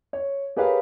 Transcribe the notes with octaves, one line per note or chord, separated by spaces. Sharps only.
C#5
G4 G#4 A#4 B4 C#5 F5